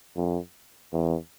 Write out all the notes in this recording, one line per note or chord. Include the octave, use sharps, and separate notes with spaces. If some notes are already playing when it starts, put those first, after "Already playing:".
F2
E2